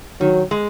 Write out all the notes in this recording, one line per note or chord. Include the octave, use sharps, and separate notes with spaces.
D#3 F#3
G#3